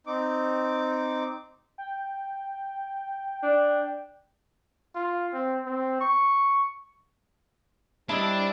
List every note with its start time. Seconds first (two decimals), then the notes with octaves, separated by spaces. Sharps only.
0.07 C4 D#4 D6
1.78 G5
3.43 D4
4.95 F4
5.33 C4
5.66 C4
6.01 C#6
8.09 G3 D4 E4 C5 D#5